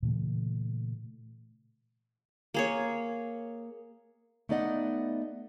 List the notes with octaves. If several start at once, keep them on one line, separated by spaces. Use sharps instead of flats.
A#2 C#3 E3 A3
A#3 G#4 C#5
A3 B3 D#4 D5 D#5 F#5